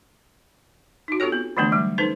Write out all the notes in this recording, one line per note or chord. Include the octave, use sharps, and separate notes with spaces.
D#4 F#4
C4 F4 G4 A4 C#5
B3
D3 E3 F3 A3 B3 D4
F#3 G3
C#4 D#4 A4 B4 C5